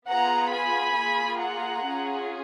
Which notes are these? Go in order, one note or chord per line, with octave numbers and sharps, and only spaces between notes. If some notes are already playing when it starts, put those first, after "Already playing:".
B3 F4 G#4 F#5 A#5
G#5 B5
A#3 F4 G#4
F#5 A#5
C#4 F4 G#4